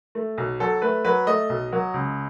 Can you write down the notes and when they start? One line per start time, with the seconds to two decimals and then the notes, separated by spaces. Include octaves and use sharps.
0.15 A3
0.38 B1
0.60 F#3 A4
0.82 A3 B4
1.05 F#3 B4
1.27 A3 D#5
1.49 B1
1.72 F#3
1.94 C#2